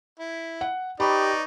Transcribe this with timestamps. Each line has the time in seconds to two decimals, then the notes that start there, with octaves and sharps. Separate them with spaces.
0.19 E4
0.61 F#5
1.00 D#4 G4 B4 C#5 D5 B5